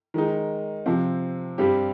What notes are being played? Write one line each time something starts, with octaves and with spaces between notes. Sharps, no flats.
D#3 G#3 D#4
C3 F3 C4
G2 G3 C4 G4